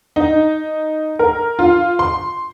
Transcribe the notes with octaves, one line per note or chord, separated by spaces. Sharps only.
D#4
A#4
F4
C6